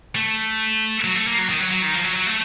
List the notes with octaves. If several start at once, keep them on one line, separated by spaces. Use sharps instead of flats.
A3
F#3
A3
A#3
F#3
D#3
F#3
F#3
D#3
F3
F#3
F#3
A3